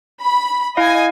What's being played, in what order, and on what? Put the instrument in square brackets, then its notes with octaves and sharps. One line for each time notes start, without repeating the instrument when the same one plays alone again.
[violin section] B5
[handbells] E4 F5 [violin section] D#5 G#5